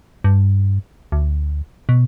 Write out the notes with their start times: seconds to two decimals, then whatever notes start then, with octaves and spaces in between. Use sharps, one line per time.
0.24 G2
1.12 D2
1.89 B2